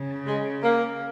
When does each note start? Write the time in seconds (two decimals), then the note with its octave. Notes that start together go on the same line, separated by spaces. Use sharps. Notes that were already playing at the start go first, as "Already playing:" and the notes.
Already playing: C#3
0.27 G#3
0.63 A#3